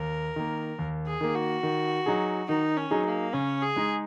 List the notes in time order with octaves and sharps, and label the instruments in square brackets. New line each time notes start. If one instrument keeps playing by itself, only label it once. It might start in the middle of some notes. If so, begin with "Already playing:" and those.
Already playing: [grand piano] D#2 [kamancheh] A#4
[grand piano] D#3 A#3
D#2
[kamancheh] G#4
[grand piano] D#3 A#3
[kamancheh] F#4
[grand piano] D#3
F#3 D#4 G#4
[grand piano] D#3 [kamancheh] D#4
[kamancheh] C#4
[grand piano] F#3 D#4 G#4
[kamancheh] A#3
[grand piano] C#3 [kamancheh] C#4
[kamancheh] G#4
[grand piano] G#3 D#4